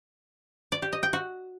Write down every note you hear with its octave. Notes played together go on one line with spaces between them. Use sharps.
D5
G4
D#5
G5
F#4